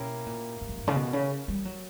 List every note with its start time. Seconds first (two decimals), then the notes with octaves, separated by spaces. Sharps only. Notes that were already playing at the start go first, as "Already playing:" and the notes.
Already playing: B2 A#3 C#4 E4 G4 A#4
0.26 A#2
0.61 G2
0.69 F#2
0.77 G2
0.88 C#3
0.96 B2
1.13 C#3
1.48 G3
1.65 F#3